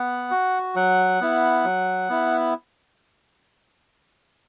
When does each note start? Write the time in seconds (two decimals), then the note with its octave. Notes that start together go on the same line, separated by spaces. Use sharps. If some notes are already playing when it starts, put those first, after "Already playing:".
Already playing: B3 F#5
0.31 F#4
0.75 F#3 F#5
1.21 B3 E4
1.64 F#3
2.09 B3 E4